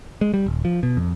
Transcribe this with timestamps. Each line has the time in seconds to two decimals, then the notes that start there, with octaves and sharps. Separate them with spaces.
0.21 G#3
0.34 G3
0.46 D#1
0.65 F3
0.83 B2
0.97 F2